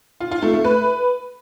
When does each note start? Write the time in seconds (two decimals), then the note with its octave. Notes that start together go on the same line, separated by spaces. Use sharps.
0.20 F4
0.31 F4
0.42 A3
0.53 A3
0.65 B4